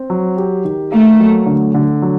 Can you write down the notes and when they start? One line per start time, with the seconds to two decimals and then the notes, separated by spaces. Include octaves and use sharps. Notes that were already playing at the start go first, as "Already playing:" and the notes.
Already playing: C4
0.10 F#3
0.37 G4
0.65 D#3
0.92 A3 A#3
1.19 F#3
1.46 D3
1.74 D3
2.02 F#3